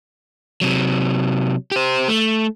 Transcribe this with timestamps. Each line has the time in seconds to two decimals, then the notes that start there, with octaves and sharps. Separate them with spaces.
0.61 C3 F#3
1.72 G4 C5
2.08 A3